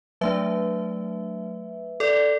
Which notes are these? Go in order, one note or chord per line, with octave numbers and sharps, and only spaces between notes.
F#3 A3 D4 B4 E5
A4 D5